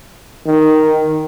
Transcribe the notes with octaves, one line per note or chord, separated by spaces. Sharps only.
D#3